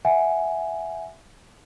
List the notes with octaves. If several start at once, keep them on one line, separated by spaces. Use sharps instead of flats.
E5 F#5 G#5